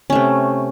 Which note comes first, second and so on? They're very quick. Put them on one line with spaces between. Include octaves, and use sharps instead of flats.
C#4 A3 C3